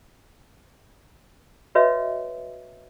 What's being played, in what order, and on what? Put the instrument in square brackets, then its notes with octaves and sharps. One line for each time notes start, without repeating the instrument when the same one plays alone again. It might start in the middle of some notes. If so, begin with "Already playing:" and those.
[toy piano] F#4 B4 C#5 D#5 E5